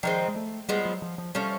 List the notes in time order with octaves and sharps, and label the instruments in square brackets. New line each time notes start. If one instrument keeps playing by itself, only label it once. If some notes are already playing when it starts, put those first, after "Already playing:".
[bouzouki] D#3 G#3 C4 [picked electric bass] F3
[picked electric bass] G#3
A3
[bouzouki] F3 G#3 B3 [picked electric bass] G3
[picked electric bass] F#3
F3
F3
[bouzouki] F3 A3 C#4 [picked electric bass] G3